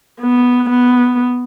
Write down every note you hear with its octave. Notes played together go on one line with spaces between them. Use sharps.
B3
B3